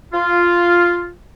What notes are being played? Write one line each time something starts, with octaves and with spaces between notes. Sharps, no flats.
F4